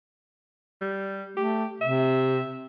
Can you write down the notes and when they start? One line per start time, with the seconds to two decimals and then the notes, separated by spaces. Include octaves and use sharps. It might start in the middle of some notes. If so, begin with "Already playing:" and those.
0.81 G3
1.37 A3 G4
1.81 C3 E5